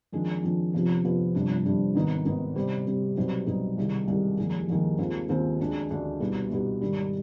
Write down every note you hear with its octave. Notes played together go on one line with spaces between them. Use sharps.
F2 D#3 G#3 D4
F2 D#3 G#3 D4
F1 F2 C3 F3 B3
F1 F2 C3 F3 B3
G1 F2 C3 G3 D4
G1 F2 C3 G3 D4
G#1 G#2 D#3 B3 D#4
G#1 G#2 D#3 B3 D#4
C3 G3 C4
C3 G3 C4
B1 B2 G3 C4 D#4
B1 B2 G3 C4 D#4
C2 C3 D#3 G#3
C2 C3 D#3 G#3
F1 D#2 D#3 G#3
F1 D#2 D#3 G#3
D#2 D#3 G#3 C4 F4
D#2 D#3 G#3 C4 F4
D2 D3 G#3 D4
D2 D3 G#3 D4
C2 B2 B3 D#4 G4
C2 B2 B3 D#4 G4
G#2 D#3 G3